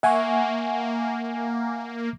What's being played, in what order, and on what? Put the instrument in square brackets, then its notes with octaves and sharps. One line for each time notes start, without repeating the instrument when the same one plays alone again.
[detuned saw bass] A#3 [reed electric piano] E5 C#6 [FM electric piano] F#5 G#5